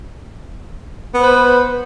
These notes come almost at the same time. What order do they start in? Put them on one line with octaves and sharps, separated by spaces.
B3 C5 B4